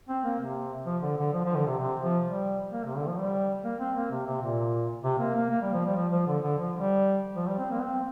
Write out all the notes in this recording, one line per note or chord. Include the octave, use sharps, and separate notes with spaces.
C4
A#3
C3
F3
D3
D3
F3
F3
D3
C3
C3
F3
G3
A#3
C3
D3
F3
G3
A#3
C4
A#3
C3
C3
A#2
C3
A#3
A#3
A#3
G3
F3
G3
F3
F3
D3
D3
F3
G3
F3
G3
C4
A#3
C4